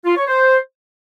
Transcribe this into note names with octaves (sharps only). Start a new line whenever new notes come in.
F4
C#5
C5